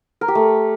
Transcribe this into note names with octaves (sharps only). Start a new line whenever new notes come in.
A#4
G4
A3